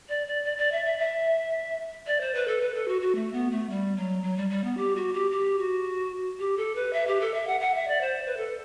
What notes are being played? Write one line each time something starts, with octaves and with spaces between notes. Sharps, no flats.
D5
D5
D5
D5
E5
E5
E5
D5
C5
B4
A4
B4
A4
F#4
F#4
A3
B3
A3
G3
F#3
F#3
G3
G3
B3
G4
F#4
G4
G4
F#4
G4
A4
B4
E5
G4
A4
E5
F#5
F#5
E5
D5
C5
B4
A4